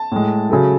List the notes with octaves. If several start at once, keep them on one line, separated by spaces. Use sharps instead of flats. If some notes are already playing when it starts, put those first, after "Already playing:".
Already playing: A5
A2 G#3
C#3 F#3 A3